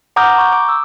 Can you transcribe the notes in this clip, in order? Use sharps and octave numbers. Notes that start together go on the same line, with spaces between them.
F#5 A#5 D6 D#6 F6 G6
A#5 C#6 G6
D6
E6